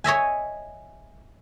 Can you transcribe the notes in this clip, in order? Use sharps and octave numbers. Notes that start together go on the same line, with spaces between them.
C#5 D#5 E5 G#5